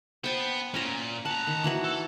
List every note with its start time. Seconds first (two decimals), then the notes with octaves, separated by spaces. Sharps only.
0.24 B3 C5 G5 A5
0.74 A#2 C#4 G#5 A#5
1.25 F#5 A5 A#5
1.47 D#3
1.64 E3 E4 F#4
1.84 A4